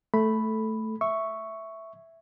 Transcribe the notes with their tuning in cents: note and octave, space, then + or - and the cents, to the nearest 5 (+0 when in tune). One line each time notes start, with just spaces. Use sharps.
A3 +0 A4 -10 B5 +0
E5 +0 C#6 +0